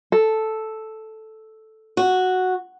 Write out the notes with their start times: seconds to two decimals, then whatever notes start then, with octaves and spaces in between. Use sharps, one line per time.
0.12 A4
1.97 F#4